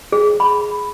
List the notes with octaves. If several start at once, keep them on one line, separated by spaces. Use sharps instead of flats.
G#4
B5